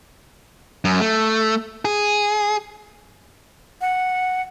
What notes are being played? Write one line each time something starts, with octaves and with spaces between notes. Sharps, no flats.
F#2
A3
G#4
F#5